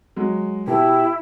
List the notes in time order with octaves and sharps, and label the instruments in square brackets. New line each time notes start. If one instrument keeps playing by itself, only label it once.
[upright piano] F#3 G#3
[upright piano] B2 [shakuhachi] E4 [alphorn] G4